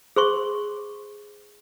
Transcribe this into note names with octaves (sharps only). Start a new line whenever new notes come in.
G#4 C5 C6 C#6